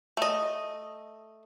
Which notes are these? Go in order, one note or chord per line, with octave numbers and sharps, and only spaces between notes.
A3 D#5